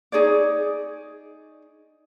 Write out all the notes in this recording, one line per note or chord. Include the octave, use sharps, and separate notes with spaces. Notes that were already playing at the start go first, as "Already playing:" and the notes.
D#4 G#4 C#5 D5